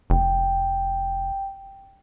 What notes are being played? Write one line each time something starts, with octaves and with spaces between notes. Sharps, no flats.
F1 G5